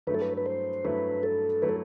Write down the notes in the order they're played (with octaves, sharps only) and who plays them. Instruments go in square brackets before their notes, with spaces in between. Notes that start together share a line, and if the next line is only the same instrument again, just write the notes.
[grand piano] G2 F#3 A3 E4 [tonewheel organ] B4
[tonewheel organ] A4
B4
B4
C5
[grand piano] G2 F#3 A3 E4 [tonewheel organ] B4
[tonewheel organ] A4
[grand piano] F#3 A3 E4 [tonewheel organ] B4
[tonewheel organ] A4